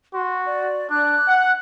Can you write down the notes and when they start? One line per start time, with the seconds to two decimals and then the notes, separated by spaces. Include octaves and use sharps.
0.14 F#4 C6
0.46 D5
0.90 D4 F#6
1.28 F#5